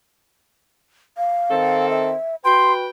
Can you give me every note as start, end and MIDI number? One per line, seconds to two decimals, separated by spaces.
1.17 1.89 77
1.51 2.14 51
1.51 2.14 60
1.51 2.14 69
1.90 2.35 76
2.45 2.85 66
2.45 2.88 71
2.45 2.88 79
2.45 2.73 84